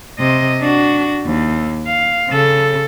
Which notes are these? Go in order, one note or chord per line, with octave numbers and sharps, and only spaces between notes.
C3 D#5
D4 F#4
D#2
F5
C#3 A4